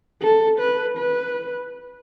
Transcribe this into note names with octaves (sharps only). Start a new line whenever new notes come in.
A4
B4
B4